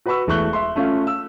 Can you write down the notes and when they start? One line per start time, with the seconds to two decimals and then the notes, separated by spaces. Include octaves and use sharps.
0.06 F#4 B4 F#5 B5 C#6 E6
0.27 E1 E3 A3 C#6 F#6 G7
0.53 E5 C6
0.76 A3 C#4 F4
1.07 E6